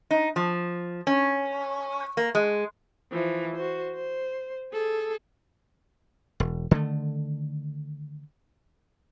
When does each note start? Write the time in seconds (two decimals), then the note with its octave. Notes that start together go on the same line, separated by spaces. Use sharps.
0.11 D#4
0.36 F3
1.07 C#4
2.17 A#3
2.35 G#3
3.12 E3 F3
3.56 F#4 C5
3.95 C5
4.73 G#4 A4
6.40 E1
6.71 D3 D#3 G#3 A3